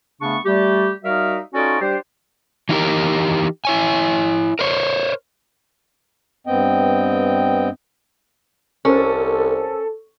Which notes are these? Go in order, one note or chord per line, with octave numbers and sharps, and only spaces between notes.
C#3 A3 B3 D4 C#6
G3 A3 G4
G3 D#4 F#4 A#4 E5 F5
C#4 D#4 F4 F#4 A4 D5
G3 D4 G4 C5
E3 D#4 F4 G4 A#4
E4 C#5 G#5
A#4 C5 C#5
G2 B3 C4 D#5 G5
C2 C#4 A4 A#4 C5